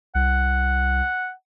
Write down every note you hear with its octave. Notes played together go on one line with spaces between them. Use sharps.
C2 F#5